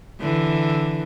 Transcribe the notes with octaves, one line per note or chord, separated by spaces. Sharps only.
D3 E3